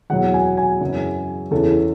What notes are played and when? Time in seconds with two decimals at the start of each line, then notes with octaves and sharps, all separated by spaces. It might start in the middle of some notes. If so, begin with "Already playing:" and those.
0.10 E2 B2 F#3 F#5
0.33 G#5
0.57 G#5
0.81 F#2 C#3 E3
1.51 E2 C#3 E3 A4